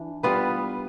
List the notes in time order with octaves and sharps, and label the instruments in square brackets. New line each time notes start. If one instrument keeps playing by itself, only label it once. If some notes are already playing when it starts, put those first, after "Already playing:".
Already playing: [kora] E3 D4
G3 B3 F4 B4